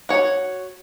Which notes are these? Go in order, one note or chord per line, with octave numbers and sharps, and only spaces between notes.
F#4 C#5